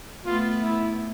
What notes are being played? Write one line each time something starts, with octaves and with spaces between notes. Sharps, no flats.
A3 B3 F4
E4